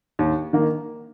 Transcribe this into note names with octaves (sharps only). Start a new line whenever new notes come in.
D#2
D#3 A#3